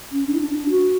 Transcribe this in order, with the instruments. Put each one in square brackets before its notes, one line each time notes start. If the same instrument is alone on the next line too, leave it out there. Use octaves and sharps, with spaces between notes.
[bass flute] C#4
D4
E4
D4
D4
F#4